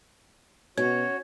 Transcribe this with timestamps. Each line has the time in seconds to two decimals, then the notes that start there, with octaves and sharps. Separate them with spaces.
0.77 B2 C#4 F#4 C#5 G#6